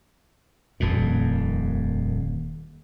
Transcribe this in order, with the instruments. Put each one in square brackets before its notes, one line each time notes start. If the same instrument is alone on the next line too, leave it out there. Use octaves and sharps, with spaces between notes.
[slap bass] D#1 F2 A#2